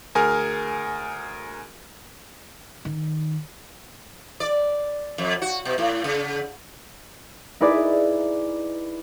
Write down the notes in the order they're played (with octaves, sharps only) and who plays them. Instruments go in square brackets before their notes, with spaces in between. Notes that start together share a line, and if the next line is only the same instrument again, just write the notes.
[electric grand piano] D2 G#4 A#4 G#5 F6
[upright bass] D#3
[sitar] D5
F2
F#4
B2
A2
C#3
[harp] D#4 E4 G#4 B4 D5